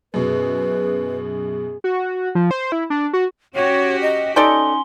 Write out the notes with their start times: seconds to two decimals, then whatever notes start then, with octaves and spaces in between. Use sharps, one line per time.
0.14 F#2 B2 G#4 B4
1.84 F#4
2.35 F3
2.51 C5
2.72 E4
2.90 D4
3.13 F#4
3.55 C#4 F#4 G4 C#5
4.02 D#5
4.36 C#4 D#4 A4 D5 G5 G#5 C6 G7